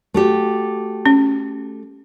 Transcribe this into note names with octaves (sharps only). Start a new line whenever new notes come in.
A3 F#4 G4
C#4